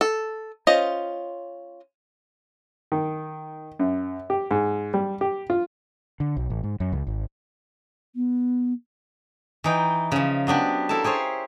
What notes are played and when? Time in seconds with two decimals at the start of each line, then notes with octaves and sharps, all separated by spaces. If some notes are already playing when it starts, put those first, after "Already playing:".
0.01 A4
0.67 C#4 F4 C5 D#5
2.92 D#3
3.79 F#2
4.30 G4
4.51 G#2
4.94 G3
5.21 G4
5.50 F4
6.20 D3
6.37 B1
6.50 A1
6.63 G#2
6.80 F#2
6.92 C#2
7.07 G#1
8.15 B3
9.64 E3 D#4 G5
10.12 C#3 F3
10.47 F#3 B3 D4 G4
10.89 E4 A4 A#4 C5 A5
11.04 G4 G#4 C5 C#5